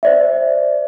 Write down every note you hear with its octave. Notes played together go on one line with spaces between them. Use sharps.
C5 D5 E5